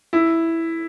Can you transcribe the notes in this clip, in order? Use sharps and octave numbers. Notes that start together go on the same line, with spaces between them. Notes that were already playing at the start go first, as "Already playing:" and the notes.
E4